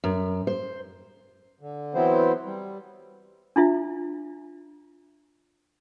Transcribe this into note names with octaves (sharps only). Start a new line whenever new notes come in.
F#2
C5
D3
E3 F#3 B3 C4 E4 C5
G3
D4 E4 F4 E5